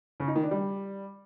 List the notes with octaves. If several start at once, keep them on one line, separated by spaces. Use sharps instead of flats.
C#3
D#4
D#3
D4
G3